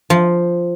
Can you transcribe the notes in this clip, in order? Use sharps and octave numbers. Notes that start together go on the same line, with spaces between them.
F3